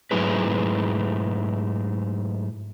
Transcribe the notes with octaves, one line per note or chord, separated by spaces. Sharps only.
G#2 F#3 A3 E4 G#4 B4